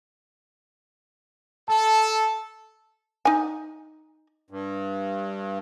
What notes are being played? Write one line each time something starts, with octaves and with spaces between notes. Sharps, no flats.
A4 A5
D#4 G#5
G2